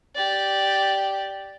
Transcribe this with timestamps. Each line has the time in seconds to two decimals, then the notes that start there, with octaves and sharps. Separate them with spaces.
0.15 G4 D5